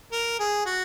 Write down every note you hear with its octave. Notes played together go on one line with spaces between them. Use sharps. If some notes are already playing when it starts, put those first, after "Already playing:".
A#4
G#4
F#4